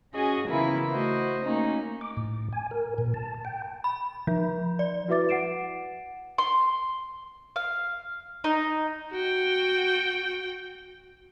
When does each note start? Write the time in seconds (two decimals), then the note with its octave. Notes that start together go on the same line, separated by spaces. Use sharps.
0.14 C#4 F#4 G#4 D#5 G#5
0.49 C#3 E3 A#3 B3 E4 F4
0.91 A3 F#4 C5 D#5
1.44 A3 A#3 C#4 D#4
2.01 D6
2.17 A2
2.53 G#5
2.71 A#4
2.98 A#2
3.14 A5
3.45 G5
3.84 B5
4.27 F3
4.79 D5
5.08 E4 F#4 B4 E5 D6 A6
5.29 F#5 C7 D7 E7
6.38 C6
7.56 F5
8.44 D#4
9.11 F#4 G5